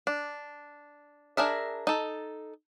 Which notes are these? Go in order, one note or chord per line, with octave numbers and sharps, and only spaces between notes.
D4
D4 G#4 A#4 E5
D#4 A4